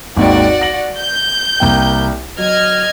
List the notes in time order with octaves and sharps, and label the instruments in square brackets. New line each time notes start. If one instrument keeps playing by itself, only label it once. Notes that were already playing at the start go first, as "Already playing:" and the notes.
[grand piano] G#1 D#2 G#2 [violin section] F#4 D5 F#5
[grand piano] A#6 F#7
[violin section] G6
[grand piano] C2 A#3 G5
[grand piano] F#3 [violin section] D#5 F6 G#6